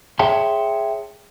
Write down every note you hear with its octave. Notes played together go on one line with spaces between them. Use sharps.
G#4 C#5 E5 G5 A5 C6